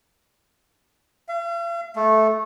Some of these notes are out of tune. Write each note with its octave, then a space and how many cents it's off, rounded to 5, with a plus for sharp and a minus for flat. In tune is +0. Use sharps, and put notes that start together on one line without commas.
F5 -45
A3 -10